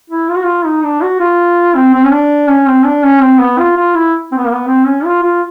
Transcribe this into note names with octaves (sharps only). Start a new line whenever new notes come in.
E4
F4
F#4
F4
D#4
D4
F#4
F4
C4
C4
C#4
D4
C#4
C4
D4
C#4
C4
B3
F4
F4
E4
C4
B3
A#3
B3
C4
C#4
F4
F4